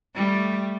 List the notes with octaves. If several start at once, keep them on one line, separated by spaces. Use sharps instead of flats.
G3 A3